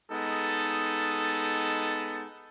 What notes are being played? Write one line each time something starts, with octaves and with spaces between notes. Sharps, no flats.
G#3 B3 D#4 A4